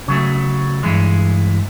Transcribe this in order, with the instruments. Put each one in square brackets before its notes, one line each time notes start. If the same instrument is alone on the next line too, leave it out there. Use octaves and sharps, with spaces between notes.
[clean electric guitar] C#3 F#3 A3
G2 E3 G#3